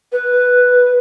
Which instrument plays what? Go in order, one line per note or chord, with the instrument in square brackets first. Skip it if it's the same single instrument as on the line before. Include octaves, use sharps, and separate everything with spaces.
[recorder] B4